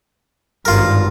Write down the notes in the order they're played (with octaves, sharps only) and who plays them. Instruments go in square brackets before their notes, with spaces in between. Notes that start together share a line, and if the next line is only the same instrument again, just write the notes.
[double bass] G#1 G2 [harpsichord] F4 A#4